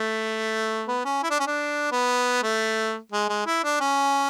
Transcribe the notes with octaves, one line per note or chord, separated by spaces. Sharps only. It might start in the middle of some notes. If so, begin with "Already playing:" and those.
Already playing: A3
B3
C#4
E4
D4
C#4
D4
B3
A3
G#3
G#3
E4
D4
C#4